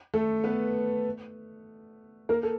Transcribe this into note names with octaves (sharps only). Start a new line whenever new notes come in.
A3 A4
B3 B4
A#3 A#4
A4